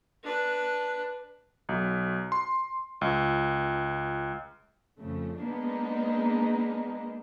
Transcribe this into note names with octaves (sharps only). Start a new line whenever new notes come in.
D4 B4
B1
C6
C#2
F2 C#3 A3
G#3 A#3 B3 D4 D#4